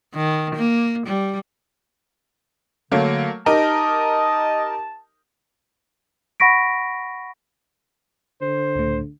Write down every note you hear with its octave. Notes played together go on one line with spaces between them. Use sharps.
D#3
A#3
G3
D3 F#3 A3 A#3
D#4 G4 A#4 D#5 A5
F#5 B5 C#6 A#6 B6 D7
D3 C5
C#2 A2 A3